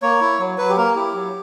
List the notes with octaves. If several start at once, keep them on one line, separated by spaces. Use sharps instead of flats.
A#3 C#5
E4
F#3
F#3 B4
G4
A#3 A#4
E4 G4
F#3